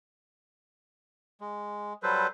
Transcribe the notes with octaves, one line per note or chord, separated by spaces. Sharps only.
G#3
F#3 G3 A4 B4 C5